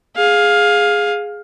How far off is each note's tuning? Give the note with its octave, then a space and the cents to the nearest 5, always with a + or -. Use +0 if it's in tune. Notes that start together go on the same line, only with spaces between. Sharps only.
G#4 +0 F5 +15